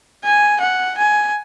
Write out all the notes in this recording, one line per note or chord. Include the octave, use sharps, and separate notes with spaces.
G#5
F#5
G#5